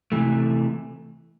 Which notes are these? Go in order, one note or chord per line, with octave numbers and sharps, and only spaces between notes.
C3 E3 A3